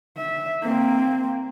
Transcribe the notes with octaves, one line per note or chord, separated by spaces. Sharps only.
E5
A#3 C4